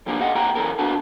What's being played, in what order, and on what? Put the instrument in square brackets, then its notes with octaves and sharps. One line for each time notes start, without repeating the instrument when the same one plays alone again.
[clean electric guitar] F2 F3 A#3 D4 G4
G4 D#5 F5 F#5
C2 A#3 G4 F#5 G5 A#5
F#2 E3 C#4 A4 A#4
A#3 B3 D4 F#4 A5